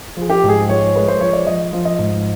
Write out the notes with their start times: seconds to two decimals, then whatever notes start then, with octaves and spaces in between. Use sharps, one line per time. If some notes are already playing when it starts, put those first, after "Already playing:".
0.17 F3 G#4
0.29 G4
0.43 G#2
0.49 G#4
0.68 F3 C#5
0.95 G#3 B4
1.08 C5
1.20 F3 C#5
1.33 D5
1.46 F3 D#5
1.72 F3
1.85 D#5
1.99 G#2